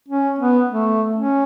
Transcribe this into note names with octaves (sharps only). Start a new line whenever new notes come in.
C#4
B3
A3
C#4